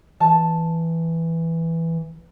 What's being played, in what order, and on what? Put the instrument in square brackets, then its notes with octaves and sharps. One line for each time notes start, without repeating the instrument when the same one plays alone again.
[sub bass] E3 [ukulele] A5